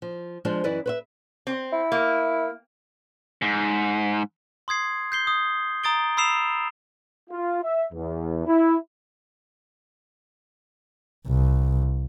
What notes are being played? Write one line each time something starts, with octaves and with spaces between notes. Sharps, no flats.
F3
F3 G#3 D4 C5
F#2 E3 E4 B4 D5 D#5
B4 C5 E5
C4
E4
A#3
G#2
C6 D#6 G#6 C7
G6 C7 G7
D#6
A#5 D#6 A6 D7 G7
B5 D#6 E6 C7 E7 F7
F4
E5
E2
E4
C2